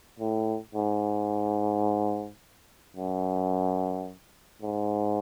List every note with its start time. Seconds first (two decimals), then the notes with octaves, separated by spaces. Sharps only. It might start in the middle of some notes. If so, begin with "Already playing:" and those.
0.19 A2
0.75 G#2
2.96 F#2
4.62 G#2